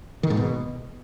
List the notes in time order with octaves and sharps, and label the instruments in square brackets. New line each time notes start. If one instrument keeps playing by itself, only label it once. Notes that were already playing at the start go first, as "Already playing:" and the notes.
[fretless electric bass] D#3
G#2
B2